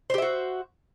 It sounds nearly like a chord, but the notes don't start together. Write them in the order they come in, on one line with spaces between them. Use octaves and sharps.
C5 G4 E5 F#4